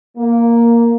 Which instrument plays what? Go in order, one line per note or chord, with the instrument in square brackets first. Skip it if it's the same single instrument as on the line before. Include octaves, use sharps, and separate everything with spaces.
[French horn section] A#3